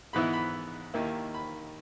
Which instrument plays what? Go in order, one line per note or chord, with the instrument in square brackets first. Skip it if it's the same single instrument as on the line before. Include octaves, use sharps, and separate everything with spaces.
[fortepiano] G#2 E3 B3 E4 B5
B5
D#2 D#3 A#3 E4
B5